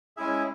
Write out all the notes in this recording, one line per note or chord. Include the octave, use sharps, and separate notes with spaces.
G#3 C#4 E4 G#4 E5